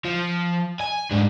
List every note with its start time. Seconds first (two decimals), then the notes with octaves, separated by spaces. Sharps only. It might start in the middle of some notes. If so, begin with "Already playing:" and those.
0.05 F3
0.81 G#5
1.12 G#2 D4